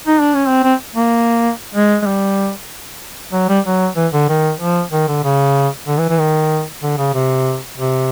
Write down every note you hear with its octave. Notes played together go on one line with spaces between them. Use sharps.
D#4
D4
C#4
C4
C4
A#3
G#3
G#3
G3
F#3
G3
F#3
E3
D3
D#3
F3
D#3
D3
C#3
D3
E3
E3
D#3
D3
C#3
C3
C3